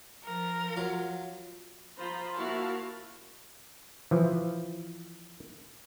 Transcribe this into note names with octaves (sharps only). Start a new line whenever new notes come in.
F3 A#4
F#3 F4
F3 F4 C5 A#5 B5
F3 A#3 E4 F#4 F5 A5
E3 F3